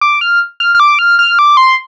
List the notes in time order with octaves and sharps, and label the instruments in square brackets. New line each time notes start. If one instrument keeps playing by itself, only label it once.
[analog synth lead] D6
F6
F6
F6
D6
F6
F6
D6
C6